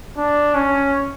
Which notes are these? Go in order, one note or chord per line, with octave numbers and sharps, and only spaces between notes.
D4
C#4